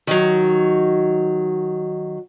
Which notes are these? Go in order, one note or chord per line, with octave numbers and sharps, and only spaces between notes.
D#3 F#3